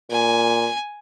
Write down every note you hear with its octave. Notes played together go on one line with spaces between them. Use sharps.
A#2 G#5